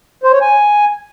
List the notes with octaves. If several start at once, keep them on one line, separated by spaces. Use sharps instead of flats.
C5
C#5
G#5